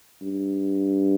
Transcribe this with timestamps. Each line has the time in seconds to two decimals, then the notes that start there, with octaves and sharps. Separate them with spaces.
0.22 G2